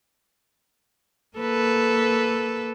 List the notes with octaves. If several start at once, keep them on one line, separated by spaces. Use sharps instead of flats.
A#3 A4 B4